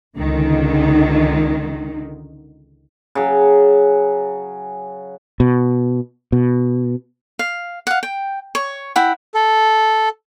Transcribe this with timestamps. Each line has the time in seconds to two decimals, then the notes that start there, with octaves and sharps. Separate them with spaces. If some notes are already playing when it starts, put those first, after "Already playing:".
0.17 C#2 D3 D#3
3.15 C#3 F#3
5.40 B2
6.32 B2
7.39 F5
7.87 F5 F#5
8.03 G5
8.55 C#5
8.96 E4 F#5 G5
9.34 A4